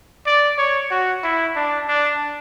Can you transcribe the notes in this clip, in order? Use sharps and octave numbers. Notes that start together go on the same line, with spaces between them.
D5
C#5
F#4
E4
D4
D4